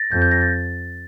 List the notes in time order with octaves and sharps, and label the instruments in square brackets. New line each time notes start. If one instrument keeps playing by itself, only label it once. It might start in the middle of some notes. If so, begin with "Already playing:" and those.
Already playing: [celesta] A6 A#6
[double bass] F2 [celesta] G6
[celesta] G6
A#6
A6